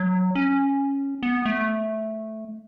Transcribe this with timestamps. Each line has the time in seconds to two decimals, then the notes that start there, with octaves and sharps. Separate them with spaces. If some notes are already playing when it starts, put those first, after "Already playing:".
Already playing: F#3
0.35 C#4
1.23 B3
1.46 A3